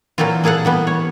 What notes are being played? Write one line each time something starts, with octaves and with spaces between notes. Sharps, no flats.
A#2 E3 F#3 A#3 C4 F4
A#3 G#4 A4 F5 F#5
E3 G3 B3
C#5